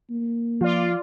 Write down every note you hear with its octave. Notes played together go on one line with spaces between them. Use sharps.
A#3
F3 F4 D5